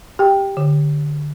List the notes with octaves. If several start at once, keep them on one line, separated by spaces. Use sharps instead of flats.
G4 G5
D3